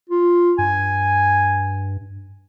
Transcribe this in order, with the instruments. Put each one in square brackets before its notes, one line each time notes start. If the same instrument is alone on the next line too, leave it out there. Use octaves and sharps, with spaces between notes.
[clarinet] F4
[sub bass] G2 [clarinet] G#5